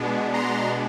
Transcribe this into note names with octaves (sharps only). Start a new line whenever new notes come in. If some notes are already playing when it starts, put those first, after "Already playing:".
Already playing: B2 G#3 B3 D4
A#5 C6